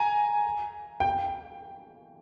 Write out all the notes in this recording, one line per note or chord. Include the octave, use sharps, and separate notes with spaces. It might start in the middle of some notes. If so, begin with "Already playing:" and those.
Already playing: G#5 A#5
G5